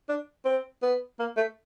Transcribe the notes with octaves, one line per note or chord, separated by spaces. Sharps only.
D4
C4
B3
A#3
A3